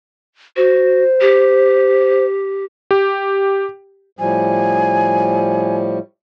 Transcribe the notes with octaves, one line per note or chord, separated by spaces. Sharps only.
F#4 C5
G4
G4
A2 F3 G3 G#5